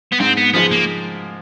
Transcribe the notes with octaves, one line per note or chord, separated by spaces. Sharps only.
B3
G#2 C4
B3
F3 G#3 B3
A#3